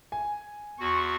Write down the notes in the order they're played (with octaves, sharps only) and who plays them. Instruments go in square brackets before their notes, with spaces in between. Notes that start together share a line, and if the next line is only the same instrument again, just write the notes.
[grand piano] G#5
[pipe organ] E2 F#4 [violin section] C6 C#6